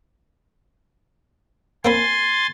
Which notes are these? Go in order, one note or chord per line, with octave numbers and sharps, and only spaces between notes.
A#3 C4 G#5 B5 C6 A6